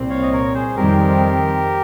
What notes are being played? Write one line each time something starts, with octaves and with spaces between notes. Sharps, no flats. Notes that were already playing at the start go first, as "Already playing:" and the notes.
Already playing: C2 A#2 G3 C4
C#5 F5
D#5
A#4 C#5
G#4 C5
F2 D#3 G3 C4 G4 A#4